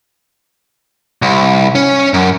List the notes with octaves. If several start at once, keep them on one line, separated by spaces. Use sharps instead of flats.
C2
C#4
F#2